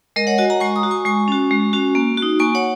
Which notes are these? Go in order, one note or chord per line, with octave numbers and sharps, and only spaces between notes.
G#3 A#4 D#5
C#5 F#5
F#4 D#5 G#5
F#5 A#5
G#3 G#5 C#6
A#5 D#6
F#4
G#5 C#6
G#3 G#5 C#6
C#4 F#4
G#3
C#4 F#4
A#3
F#4
D#4
A#3 G#5 C#6
C#5 F#5